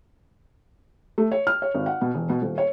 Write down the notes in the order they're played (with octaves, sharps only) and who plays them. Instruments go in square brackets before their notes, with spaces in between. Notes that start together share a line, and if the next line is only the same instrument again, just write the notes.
[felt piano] A3
C#5
F6
C#5
G#1
F#5
B2
E1
B2
D#1
C#5